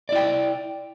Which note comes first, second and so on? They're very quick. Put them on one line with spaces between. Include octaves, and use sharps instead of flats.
D5 E4 G5